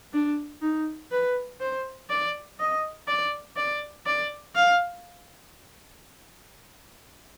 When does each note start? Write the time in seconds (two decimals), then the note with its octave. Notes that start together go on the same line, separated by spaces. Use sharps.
0.13 D4
0.61 D#4
1.11 B4
1.60 C5
2.10 D5
2.59 D#5
3.07 D5
3.56 D5
4.06 D5
4.55 F5